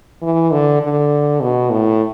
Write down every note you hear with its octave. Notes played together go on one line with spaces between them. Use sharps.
E3
D3
D3
B2
A2